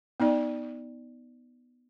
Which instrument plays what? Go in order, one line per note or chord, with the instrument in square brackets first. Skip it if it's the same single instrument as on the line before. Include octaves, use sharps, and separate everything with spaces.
[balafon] B3 D#4 D5